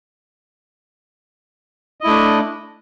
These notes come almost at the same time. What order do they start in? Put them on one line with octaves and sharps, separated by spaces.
D#5 E4 A3 D4